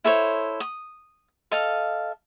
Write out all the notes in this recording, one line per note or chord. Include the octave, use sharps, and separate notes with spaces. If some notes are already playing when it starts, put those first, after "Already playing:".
E4 A4 C5 C#5
D#6
A4 D#5 F5